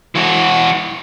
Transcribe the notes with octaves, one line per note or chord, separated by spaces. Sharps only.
E3 F#4